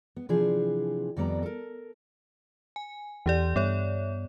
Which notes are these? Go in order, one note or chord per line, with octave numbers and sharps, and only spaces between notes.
B3
C3 E3 F3 D4 G#4
F2 D#3 G3 B3 D5 A#5
A4 A#4
G#5
E2 E3 G4 D5
G2 B3 C#5 D5